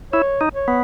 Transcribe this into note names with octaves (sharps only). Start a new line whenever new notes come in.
E4 C#5
D#4
C#5
B3